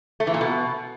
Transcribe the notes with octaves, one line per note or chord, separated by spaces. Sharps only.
A3
E3
A#2
B2